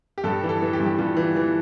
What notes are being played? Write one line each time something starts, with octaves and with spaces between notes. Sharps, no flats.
G4
G2 A4
E3
A4
E3
G4
G2
G4
G2 F4
E3
E3